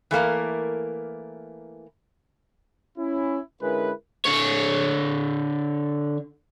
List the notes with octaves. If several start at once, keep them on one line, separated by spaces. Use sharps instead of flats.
E3 A3 A#3 A#4
C#4 E4
D3 G#3 C#4 E4 A#4 B4
D3 C#5